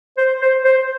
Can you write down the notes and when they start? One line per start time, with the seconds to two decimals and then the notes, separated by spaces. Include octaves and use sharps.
0.18 C5
0.42 C5
0.65 C5